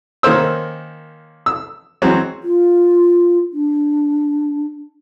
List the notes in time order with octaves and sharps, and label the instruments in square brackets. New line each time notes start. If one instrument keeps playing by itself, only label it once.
[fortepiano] D#3 A#3 C#4 C5 E6
E6
E3 F#3 G#3 C4 C#4
[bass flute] F4
D4